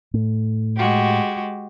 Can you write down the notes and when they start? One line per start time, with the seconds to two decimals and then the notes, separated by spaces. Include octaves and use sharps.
0.14 A2
0.77 G#3 F#4 G4